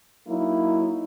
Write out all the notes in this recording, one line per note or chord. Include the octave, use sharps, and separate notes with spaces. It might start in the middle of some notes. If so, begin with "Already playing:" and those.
F#3 A#3 D#4 E4